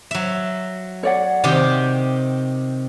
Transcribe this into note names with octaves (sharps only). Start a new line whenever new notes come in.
F#3 E5
C#5 D5 F#5
C3 D#3 G4